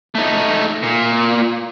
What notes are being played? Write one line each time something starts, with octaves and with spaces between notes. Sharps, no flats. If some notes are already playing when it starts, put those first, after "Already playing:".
A3 D#4
A#2